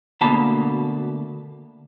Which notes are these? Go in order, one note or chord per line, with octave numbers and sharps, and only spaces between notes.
D2 B2 A#3 A5 B5